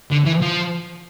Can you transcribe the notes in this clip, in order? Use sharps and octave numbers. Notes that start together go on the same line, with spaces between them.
D3
E3
F3